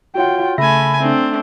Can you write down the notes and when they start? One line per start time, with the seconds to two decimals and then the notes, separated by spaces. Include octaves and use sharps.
0.15 F4 F#4 C#5 F#5 G5
0.58 C#3 A3 E5 G#5 B5 A#6
1.00 A3 C4 D4